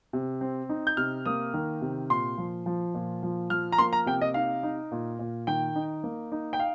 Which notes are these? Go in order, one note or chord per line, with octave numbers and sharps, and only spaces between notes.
C3
C4
D#4
G6
C3 F6
A#3 D#6
D#3
C3
A#2 C6
F3
F3
A#2
F3
F3 F6
A#5
A#3 C6
A#5
C3 G5
D#5
D#4 F5
D#4
A#2
A#2
D#3 G5
D#4
A#3
D#4
G5
F5